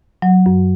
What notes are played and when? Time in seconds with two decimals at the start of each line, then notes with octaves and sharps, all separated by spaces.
0.22 F#3
0.46 F#2